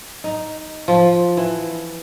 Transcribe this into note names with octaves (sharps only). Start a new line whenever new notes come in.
D#4
F3
E3